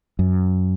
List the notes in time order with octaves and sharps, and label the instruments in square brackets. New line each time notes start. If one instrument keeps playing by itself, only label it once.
[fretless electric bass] F#2